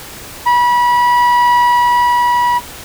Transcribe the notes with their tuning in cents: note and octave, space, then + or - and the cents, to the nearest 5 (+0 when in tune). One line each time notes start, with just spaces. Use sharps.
B5 -30